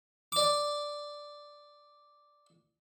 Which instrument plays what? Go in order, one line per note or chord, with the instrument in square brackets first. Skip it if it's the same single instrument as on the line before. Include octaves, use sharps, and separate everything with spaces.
[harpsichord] D5 D6